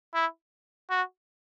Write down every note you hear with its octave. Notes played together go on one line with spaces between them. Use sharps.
E4
F#4